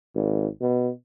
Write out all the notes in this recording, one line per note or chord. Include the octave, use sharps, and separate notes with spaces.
G#1
B2